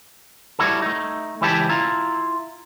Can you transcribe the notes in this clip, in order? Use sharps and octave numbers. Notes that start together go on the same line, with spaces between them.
G3 E4 F#4 A4
A3 D#4
C#2 E3 E4 G4 E5 A5
E4 F4 A#5